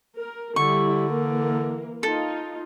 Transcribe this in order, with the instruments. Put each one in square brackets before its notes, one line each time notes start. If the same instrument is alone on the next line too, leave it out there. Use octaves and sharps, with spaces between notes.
[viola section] A#4
[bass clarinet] D3 [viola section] G3 E4 [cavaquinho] C#6
[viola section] E3 A#3 A#4
[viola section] D#4 F4 [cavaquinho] A4